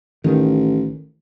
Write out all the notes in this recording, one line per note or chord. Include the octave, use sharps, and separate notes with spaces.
A1 D#3